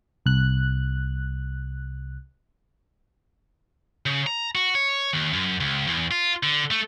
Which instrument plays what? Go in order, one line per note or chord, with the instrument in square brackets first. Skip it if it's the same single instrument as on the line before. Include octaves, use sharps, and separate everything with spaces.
[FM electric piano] C2 F#6
[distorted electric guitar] C#3
A#5
F#4
C#5
D#2
F#2
C#2
E2
F4
D3
A3